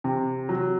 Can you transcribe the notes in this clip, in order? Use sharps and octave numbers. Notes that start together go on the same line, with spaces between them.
C3
F#3